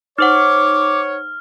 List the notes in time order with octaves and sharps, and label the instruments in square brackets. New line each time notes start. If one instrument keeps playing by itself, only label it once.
[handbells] D#4 C5 F#5 [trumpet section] C#5 [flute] D6 [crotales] F6